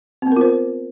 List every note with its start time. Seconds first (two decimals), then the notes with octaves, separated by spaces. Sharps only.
0.22 C4
0.27 B3
0.32 A#4
0.36 F4
0.41 C5